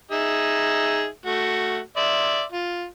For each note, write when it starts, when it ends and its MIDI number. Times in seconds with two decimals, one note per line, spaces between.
0.12 1.08 63
0.12 1.08 68
0.12 1.08 76
1.26 1.80 57
1.26 1.80 66
1.97 2.43 74
1.97 2.43 76
1.97 2.43 84
2.52 2.85 65